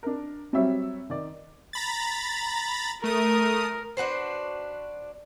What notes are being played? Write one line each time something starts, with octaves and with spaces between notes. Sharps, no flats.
D4 A#4
F#3 G3 C4 F#4 C#5 E5
D#3 D5
A#5 B5 A6
A3 A#4 D#6
D4 F#4 B4 C5